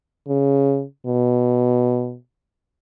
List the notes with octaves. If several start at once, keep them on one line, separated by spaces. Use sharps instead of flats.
C#3
B2